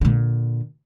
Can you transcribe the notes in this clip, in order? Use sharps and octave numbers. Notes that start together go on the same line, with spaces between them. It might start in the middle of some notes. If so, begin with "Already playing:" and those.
A#2 D3